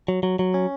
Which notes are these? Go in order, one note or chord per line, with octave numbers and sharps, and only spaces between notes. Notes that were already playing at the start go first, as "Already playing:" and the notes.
F#3
F#3
F#3
C#4